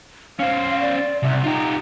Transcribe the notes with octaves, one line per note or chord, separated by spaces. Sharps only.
C#4 C5 F5
D5
C2 E5
D#4 F4 G4